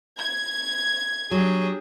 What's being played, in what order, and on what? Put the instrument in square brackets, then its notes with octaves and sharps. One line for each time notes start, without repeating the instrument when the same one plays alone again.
[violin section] G#6
[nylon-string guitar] F#3 [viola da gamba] D4 G4 G#4